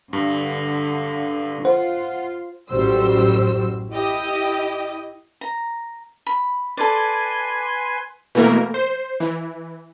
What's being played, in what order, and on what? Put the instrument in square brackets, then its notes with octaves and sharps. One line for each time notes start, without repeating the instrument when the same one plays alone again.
[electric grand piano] G2 [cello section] D3
[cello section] F4 [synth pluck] C5 [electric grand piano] F#5
[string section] A1 F#2 G3 F#4 C5 E6
E4 G4 D#5
[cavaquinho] A#5
B5
[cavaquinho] A4 D5 [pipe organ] B4 G#5 C6
[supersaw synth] B2 E3 A3 A#3 A#4
C5
E3